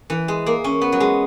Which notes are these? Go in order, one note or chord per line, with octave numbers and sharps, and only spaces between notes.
E3
G#3
A#3
C#4
B3
F#3
G#3